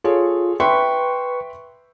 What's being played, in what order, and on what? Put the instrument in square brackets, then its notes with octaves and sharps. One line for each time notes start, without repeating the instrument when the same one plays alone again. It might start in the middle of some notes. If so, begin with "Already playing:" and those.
[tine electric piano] F4 [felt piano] G#4 A4 C#5
[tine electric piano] B4 C#6 [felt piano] E5 G5 C6